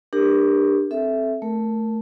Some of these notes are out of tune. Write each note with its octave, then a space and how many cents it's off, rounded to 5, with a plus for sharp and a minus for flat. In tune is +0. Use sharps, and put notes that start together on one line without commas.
D4 +25 G4 +25 A#4 +0
C4 +10 A4 -15 E5 +0
A3 +0 A#4 +0